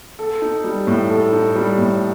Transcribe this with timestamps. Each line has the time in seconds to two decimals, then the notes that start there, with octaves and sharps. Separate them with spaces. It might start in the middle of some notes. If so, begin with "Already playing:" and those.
0.19 A4
0.42 D#4
0.64 G3
0.87 A2
1.10 A4
1.32 D#4
1.56 G3
1.78 A2